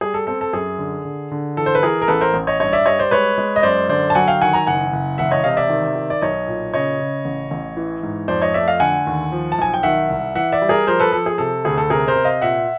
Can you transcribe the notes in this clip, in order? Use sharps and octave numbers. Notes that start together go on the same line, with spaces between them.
G3 G#4
A4
C4 A4
A4
F#2 G#4
D3
D3
D3
E3 A4
C5
B4
E3 G#4 A#4
A#4
A1 A4 B4
A#4 C5
A1
C#5 D#5
G2 C#5 D#5
D5 E5
G3 C#5 D#5
C5 D5
G#3 B4 C#5
G#3
D#5
F#2 C5 D5
D3 C5 D5
A5
F#3 F#5 G#5
F5 G5
D#3 F#5 G#5
G#5 A#5
F#1 F#5 G#5
F#1
E1 E5 F#5
C#5 D#5
C3 D#5 F5
D5 E5
D#3
D#3
D5
B1 C#5 D#5
A#2
C#3 C#5 D#5
C#3
A1
A1
E3
G#2
F2 C5 D5
C#5 D#5
A3 D5 E5
D#5 F5
D3 F#5 G#5
D#2
F3
A5
B1 G#5
G5
D#3 E5 F#5
C2
E3 E5 F#5
D5 E5
G3
G#4 A#4
F3 A#4 C5
A4 B4
F3 A4
G#4
C3 A4
D2 G#4
A4
C3 G#4 A#4
A#4 C5
C3
D#5 F5
A#2 E5 F#5